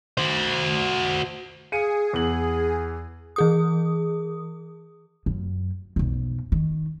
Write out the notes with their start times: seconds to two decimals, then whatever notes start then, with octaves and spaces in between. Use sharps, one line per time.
0.17 F#4 C5
1.72 G#4 F5 C#7 D#7
2.13 E2 F#7
3.36 E3 G#4 D#6
5.26 F#2
5.96 B1 F2
6.52 D#3